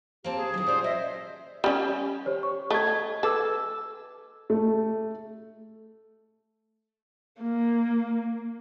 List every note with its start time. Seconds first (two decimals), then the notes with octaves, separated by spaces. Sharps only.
0.24 A#3 C4 G4 A5
0.36 G#4
0.54 D#3 E3 F#3 D#6
0.67 F#2 A#2 C5 D5
0.84 C5 D#5 E5
1.64 G3 C#4
2.26 G4 C5 C#5
2.43 C#6
2.70 A3 D#5 G#6
3.23 A4 B4 D6 E6
4.50 A3
7.42 A#3